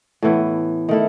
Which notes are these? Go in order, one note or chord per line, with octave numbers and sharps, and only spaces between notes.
A2 E3 B3
D#3 A3 E4